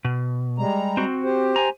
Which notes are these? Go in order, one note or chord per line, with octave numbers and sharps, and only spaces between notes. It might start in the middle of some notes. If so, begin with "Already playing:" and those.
B2
G3 G#3 A#5
C4 F#4
G4 C5
G#5 A#5